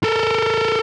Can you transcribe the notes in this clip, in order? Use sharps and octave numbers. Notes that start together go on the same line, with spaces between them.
A4 A#4